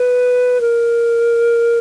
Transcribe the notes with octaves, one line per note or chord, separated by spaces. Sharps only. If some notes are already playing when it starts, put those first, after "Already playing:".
Already playing: B4
A#4